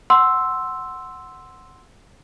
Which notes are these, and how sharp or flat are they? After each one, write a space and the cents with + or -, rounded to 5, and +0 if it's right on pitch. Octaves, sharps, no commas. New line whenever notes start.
F#5 +0 C6 +0 E6 +0